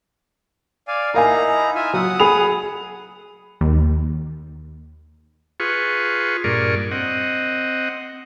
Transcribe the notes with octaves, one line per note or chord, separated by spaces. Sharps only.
D5 F5 G#5
D#4 E4 A#4 F5 G#5 A#5
F4 E5 G#5
F#3 F#5 D#6
G#4 B5 F7
D#2
F4 G#4 B4 C#6
G2 A#2 G#4 A#4 D5 C#6
C4 D#5 F#5